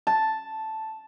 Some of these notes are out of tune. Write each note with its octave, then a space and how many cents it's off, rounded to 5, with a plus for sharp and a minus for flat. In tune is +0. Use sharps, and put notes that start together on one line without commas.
A5 +0